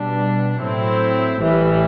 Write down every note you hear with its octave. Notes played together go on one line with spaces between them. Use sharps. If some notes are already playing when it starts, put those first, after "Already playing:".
Already playing: B2 G3 D4
A2 F#3 C4 E4
A1 A2 E3 G3